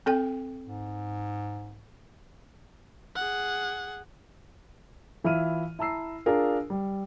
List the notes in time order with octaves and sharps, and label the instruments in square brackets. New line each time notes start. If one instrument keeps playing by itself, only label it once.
[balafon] C4 A4 G5
[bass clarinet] G#2
[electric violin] G#4 F#5
[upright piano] E3 E4 F4 F6 D#7
E4 A5 A#5 E6 C7
D4 F4 G#4 A#4
G3